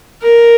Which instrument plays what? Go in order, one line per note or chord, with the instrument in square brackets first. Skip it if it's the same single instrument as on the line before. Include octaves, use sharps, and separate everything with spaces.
[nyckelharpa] A#4